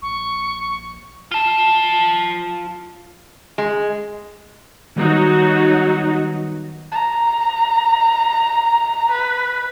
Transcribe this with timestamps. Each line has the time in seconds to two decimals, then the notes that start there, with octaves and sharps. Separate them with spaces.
0.02 A#1 C#6
1.32 F4 A5
3.58 G#3
4.96 D#3 F#3 G3 B3 D#4 F#4
6.91 A#5
9.12 B4